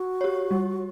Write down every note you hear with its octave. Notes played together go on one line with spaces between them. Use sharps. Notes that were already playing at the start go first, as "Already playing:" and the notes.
Already playing: F#4
G4 C#5
G3